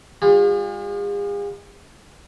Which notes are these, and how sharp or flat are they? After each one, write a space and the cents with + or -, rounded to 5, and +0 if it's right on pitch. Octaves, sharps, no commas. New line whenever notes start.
G#3 -40 F4 +35 G#4 -45